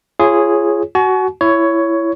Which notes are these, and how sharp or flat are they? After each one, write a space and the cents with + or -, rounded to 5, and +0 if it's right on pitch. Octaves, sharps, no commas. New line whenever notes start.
F4 -35 G#4 +0 C#5 -15
F#4 +15 G#5 +45
E4 +15 C#5 +10